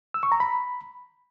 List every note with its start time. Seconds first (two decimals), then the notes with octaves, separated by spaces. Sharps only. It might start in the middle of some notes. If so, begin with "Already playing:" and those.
0.14 E6
0.23 C#6
0.32 A#5
0.40 B5